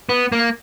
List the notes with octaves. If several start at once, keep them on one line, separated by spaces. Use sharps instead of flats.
B3
A#3